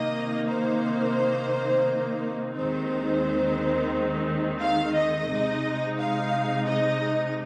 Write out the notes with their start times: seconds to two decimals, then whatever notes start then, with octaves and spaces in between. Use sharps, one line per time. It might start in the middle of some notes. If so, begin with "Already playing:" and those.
Already playing: C3 D#3 A#3 D#4 D#5
0.48 C5
2.54 D#2 D#3 G#3 C4 D#4 C5
4.61 F5
4.95 D#5
5.29 C3 G#3 D#4
5.99 F5
6.67 D#5